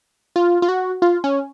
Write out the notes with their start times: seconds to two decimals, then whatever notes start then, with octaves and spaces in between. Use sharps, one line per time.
0.36 F4
0.62 F4
0.69 F#4
1.02 F4
1.24 C#4